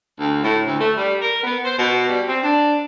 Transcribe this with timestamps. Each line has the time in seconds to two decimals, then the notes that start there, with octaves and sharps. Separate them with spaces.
0.20 D2
0.44 A2
0.66 D2
0.80 A3
0.97 G3
1.22 A#4
1.44 B3
1.65 C5
1.79 B2
2.08 G3
2.28 C4
2.43 D4